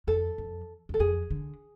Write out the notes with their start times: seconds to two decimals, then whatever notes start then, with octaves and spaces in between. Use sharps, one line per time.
0.07 F2 A4
0.38 F2
0.89 E2 A4
1.00 F2 G#4
1.31 D3